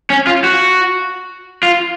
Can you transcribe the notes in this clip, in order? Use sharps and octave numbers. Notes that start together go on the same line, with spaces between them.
C#4
F4
F#4
F4